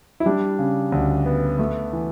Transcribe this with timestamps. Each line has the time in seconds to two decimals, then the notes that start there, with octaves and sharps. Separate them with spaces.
0.20 E4
0.26 G3 D4
0.59 C#3
0.92 D2
1.26 B3
1.59 A3
1.93 E3